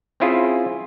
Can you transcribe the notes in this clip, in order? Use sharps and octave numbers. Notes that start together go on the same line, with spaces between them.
C4 C#4 E4 F4 G#4